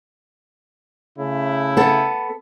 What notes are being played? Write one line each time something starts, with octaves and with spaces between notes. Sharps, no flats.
C#3 A3 E4
B3 A4